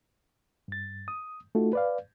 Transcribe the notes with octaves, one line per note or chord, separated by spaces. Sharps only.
G2 A6
D#6
A3 D#4 F4 F#4 A4
B4 D5 F5